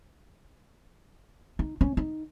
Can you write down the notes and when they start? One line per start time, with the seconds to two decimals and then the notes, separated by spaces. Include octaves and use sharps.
1.59 D#4
1.81 C#4
1.97 D#4